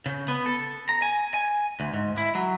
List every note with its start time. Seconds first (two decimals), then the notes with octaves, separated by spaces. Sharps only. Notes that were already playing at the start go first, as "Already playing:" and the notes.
0.06 C#3
0.28 B3
0.46 A4
0.89 A#5
1.02 G#5
1.34 G#5
1.80 D2
1.94 G#2
2.18 E4
2.35 F#3